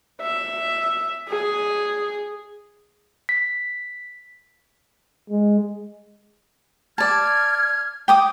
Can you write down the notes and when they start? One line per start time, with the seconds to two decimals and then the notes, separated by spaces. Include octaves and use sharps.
0.22 E5
1.29 G#4
3.29 B6
5.30 G#3
6.98 D5 A5 F6 G#6
8.08 G5 D6 D#6